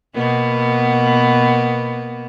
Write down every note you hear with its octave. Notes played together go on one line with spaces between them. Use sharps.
B2 A#3 B3